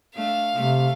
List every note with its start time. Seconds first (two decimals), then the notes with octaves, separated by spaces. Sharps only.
0.15 A3 D4 F5
0.55 C3 A3